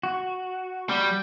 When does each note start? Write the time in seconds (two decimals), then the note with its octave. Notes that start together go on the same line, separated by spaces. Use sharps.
0.03 F#4
0.89 G3